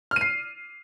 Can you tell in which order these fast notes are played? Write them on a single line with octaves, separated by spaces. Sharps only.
F6 D#7 C7